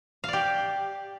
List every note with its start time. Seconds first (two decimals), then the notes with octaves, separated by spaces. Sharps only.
0.24 F5
0.28 D5
0.33 G4